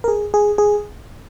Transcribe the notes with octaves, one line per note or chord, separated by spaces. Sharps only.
A#4
G#4
G#4
G#4